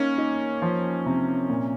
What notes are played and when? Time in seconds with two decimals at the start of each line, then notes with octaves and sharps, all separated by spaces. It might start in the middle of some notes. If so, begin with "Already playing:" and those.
Already playing: A#3 C#4 D#4
0.18 D#4
0.62 F3
1.06 C3
1.49 A#2